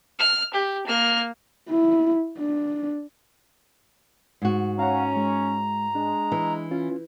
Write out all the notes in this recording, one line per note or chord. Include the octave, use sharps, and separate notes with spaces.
F6
G4
A#3 F6
E4
D4
G#2 F#4
C#4 F5 F#5 A#5
G#3
G#3 D4
E3
C#4 F4